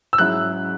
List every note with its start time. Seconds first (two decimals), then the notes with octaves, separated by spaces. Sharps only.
0.13 E6
0.18 G#2 F#3 C#4 E4 F#6